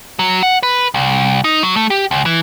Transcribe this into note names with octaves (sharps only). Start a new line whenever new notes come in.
F#3
F#5
B4
C2
D#4
F#3
A3
G4
C#2
E3